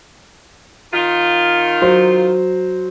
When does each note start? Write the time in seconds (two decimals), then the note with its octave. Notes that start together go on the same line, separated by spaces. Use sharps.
0.92 D#3 F4
1.82 F#3 C5